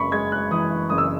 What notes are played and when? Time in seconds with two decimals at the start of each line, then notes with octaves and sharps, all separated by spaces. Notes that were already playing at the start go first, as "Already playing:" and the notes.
Already playing: F#1 B5 C#6
0.12 G#3 G#6
0.32 F#6
0.51 E3 D#6
0.90 F#1 D#6
0.98 E6